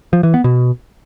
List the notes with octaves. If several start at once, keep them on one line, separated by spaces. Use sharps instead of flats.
F3
E3
B3
B2